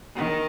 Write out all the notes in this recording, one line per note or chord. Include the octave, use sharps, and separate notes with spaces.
D#3